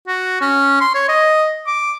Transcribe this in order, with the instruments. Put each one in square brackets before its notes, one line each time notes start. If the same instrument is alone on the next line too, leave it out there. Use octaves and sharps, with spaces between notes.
[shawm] F#4
C#4
C6
C#5
D#5
D6